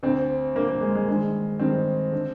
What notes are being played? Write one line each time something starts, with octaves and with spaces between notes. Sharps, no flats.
D2 D3 C4
D2 D3 A#3
A#3
G#3
G#3
G2 D#3 G#3
G2 D#3 C4
D3